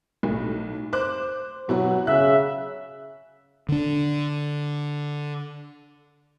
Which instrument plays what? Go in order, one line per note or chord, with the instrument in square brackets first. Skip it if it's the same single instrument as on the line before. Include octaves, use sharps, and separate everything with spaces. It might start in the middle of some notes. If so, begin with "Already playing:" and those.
[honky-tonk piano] B1 A2
C5 D6 F#6
[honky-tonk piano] B2 E4 F#4 [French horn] F#3
[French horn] C#3 [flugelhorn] E5 [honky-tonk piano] F#6
[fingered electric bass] D3 D4